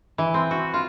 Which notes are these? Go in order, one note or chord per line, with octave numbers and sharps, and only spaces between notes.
E3
C4
F#4
F4